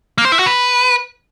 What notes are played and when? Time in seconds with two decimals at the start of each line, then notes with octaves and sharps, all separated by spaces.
0.18 A#3
0.25 C5
0.32 E4
0.39 F#4
0.46 B4